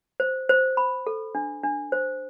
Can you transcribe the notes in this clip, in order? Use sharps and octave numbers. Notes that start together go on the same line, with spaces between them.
C5
C5
B5
A4
D4
D4
C5